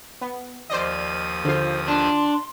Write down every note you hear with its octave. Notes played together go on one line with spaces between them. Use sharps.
B3
D#2 F3 C5 D5 D#5 D#6
D3 F4 C5
D4 C6